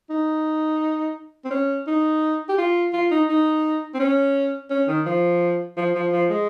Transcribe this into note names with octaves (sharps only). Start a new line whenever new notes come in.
D#4
C4
C#4
D#4
G4
F4
F4
D#4
D#4
C4
C#4
C#4
D#3
F3
F3
F3
F3
G#3